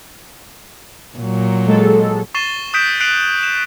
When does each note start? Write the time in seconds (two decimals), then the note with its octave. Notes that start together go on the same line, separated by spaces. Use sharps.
1.18 A#2 F#3
1.67 G#3 A4
2.35 C#6 A6 C7 D#7 E7 G7
2.74 D#6 F#6 G6 B6 D7 E7
3.00 F#6 C7 D7 D#7 F7 F#7
3.43 E7